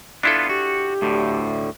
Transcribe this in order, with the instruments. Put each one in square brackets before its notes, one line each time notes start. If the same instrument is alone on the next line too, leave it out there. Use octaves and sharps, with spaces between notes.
[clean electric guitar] B3 F4 [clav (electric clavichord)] D4 E4 A4
[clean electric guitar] F#4 [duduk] G4
[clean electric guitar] D2 A2 D3